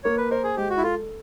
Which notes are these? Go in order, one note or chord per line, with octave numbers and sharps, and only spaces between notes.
A#3 C#5
B4
A#4 C5
G#4
G#3 G4
F#4
E4
F4 A4